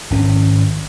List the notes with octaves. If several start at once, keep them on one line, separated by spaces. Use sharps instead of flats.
G#1 C#4